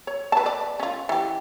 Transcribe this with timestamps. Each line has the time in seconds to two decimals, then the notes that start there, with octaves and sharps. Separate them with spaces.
0.07 C#5
0.32 B4 A5
0.46 D5
0.80 C#4 F4
1.09 E3 G4